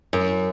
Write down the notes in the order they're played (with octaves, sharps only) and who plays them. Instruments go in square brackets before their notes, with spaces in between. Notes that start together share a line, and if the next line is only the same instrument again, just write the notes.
[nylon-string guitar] F#2